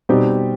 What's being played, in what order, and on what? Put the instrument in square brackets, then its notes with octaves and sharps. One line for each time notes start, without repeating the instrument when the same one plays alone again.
[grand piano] B2 G3 C4 D#4 G4